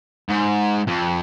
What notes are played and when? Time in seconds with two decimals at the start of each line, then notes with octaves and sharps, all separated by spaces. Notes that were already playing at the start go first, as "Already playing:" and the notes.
0.29 G#2
0.87 F2